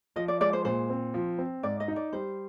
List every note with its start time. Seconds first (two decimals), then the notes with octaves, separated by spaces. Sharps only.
0.16 F3 D#5
0.28 D5
0.41 G#3 D5
0.53 C5
0.65 A#2 C5
0.90 C4
1.14 F3
1.38 C4
1.63 G#2 D5
1.80 D#5
1.88 D#4
1.96 D5
2.13 G3 C5